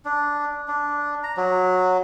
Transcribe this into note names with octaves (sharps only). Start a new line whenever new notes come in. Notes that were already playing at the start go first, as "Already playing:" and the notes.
D4
D4
A#5
F#3